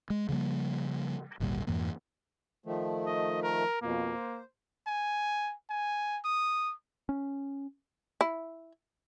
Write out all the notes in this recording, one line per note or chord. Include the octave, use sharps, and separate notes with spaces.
G#3
C#3 F3 G3 A#3
G#1 D2 A#2 G3
F2 G#2 E3 A#3
D#3 F3 A3
D#5
A#4
F2 B2 F3 A#3
C5
G#5
G#5
D#6
C#4
E4